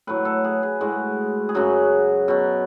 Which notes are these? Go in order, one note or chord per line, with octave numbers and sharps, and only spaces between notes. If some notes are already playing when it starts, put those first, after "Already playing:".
A2 F#3 B4
A4
G#4
G#4
A2 G#3 F#4
G#4
F#2 C#3 F#3 F#4
B2 F#3